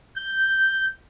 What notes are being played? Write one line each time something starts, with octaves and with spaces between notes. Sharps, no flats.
G6